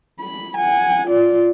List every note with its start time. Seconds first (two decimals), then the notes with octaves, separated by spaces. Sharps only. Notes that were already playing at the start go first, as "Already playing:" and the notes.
0.20 B5
0.58 F#5 G#5
1.08 F4 D5